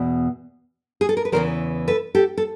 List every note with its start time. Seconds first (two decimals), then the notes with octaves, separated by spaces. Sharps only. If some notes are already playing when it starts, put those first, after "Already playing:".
Already playing: E2 B2
1.01 G#4
1.09 A4
1.17 A#4
1.25 B4
1.32 E2 C#3 E3 A#4 C5
1.88 A4 B4
2.15 G4 A4
2.37 A4